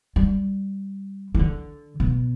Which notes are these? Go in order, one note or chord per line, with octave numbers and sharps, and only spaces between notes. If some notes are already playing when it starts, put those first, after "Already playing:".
G3
E3
D3
B2